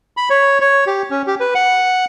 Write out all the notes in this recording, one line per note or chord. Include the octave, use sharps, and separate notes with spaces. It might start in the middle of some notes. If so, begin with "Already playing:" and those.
B5
C#5
C#5
G4
C#4
G4
B4
F#5